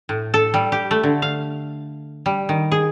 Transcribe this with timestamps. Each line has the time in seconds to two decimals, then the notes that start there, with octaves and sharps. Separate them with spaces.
0.09 A2
0.34 A4
0.54 G3
0.72 G4
0.91 A3
1.03 D3
1.22 F5
2.26 G3
2.49 D#3
2.72 G#4